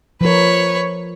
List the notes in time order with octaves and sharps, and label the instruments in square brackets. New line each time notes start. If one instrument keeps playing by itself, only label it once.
[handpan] F3 A#4 [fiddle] B4 C#5